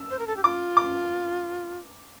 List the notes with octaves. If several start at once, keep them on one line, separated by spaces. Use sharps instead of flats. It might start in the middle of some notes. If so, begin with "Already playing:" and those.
Already playing: E6
C5
A#4
A4
G4
F4 D6
D6